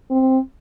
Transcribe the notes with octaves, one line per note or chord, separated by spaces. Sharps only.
C4